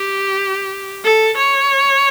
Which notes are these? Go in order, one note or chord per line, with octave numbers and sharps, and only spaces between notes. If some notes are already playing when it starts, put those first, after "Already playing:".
Already playing: G4
A4
C#5